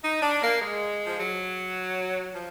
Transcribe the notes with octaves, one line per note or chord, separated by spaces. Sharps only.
D#4
D4
A#3
G#3
F3
F#3
F3